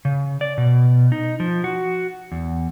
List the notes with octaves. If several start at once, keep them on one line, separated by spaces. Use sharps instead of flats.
C#3
D5
B2
D#4
F3
F#4
E2